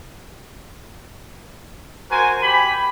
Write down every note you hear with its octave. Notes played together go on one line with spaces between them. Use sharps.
F#4 A#4 C5 G#5
G4 G#5 B5